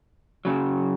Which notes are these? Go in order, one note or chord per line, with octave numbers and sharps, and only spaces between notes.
F#2 C#3 F#3